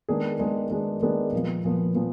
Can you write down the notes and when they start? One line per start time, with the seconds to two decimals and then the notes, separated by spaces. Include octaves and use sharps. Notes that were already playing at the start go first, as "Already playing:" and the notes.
0.08 D#3 G#3 B3 D4 G#4
0.39 D#3 G#3 B3 D4 G#4
0.70 D#3 G#3 B3 D4 G#4
1.02 D#3 G#3 B3 D4 G#4
1.32 A#2 F3 B3
1.64 A#2 F3 B3
1.95 A#2 F3 B3